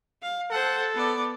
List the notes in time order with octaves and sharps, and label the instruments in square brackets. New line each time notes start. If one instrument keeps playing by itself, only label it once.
[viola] F5
[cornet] A4 [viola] C5 F#5
[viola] B3 D5